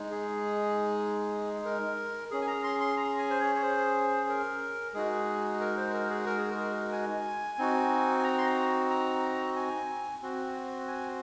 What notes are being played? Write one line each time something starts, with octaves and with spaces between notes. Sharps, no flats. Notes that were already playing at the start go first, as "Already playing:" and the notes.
Already playing: G#3 D#4
G#4
A#4
C#4 G#4
G#5
A#5
C6
C6
A#5
G#5
C5
C#5
C#5
C5
A#4
G#3 D#4 F#4 G#4
A#4
C5
A#4
G#4
A#4
G#4
A#4
G#5
C4 D#4 F#4
G#5
A#5
C6
A#5
A#5
G#5
C4 F#4
G#5